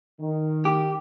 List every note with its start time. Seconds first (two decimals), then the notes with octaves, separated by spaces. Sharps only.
0.20 D#3
0.65 G4